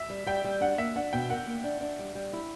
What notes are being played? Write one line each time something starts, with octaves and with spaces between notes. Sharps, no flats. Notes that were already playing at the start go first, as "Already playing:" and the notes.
Already playing: E5
G3
G3 G5
G3
D4 F#5
A#3 E5
D4 F#5
B2 G5
A#4 F#5
A#3
D4
D4
G3
G3
E4